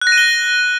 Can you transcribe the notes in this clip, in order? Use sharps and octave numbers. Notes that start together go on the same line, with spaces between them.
F#6
A#6
D#7
G7